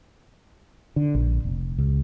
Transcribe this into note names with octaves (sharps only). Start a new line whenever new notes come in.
D3
A#1
F1
C#2